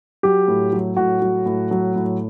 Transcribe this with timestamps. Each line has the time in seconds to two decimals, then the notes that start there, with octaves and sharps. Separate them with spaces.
0.23 F#3 G4
0.48 A2
0.73 F#3
0.97 A2 F#4
1.22 F#3
1.46 A2
1.71 F#3
1.96 A2